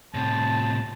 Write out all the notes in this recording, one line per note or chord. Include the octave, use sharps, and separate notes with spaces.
A2 C3 A5